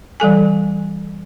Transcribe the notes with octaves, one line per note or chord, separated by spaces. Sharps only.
E3 G3 A4 G#5